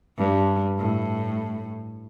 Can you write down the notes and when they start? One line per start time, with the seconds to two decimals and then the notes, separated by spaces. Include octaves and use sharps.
0.18 G2
0.79 A2